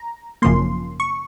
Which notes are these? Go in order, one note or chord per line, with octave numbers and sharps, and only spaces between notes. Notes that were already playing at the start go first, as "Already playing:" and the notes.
Already playing: A#5
G#1 F#2 C#3 F3 A#3 C6
C#6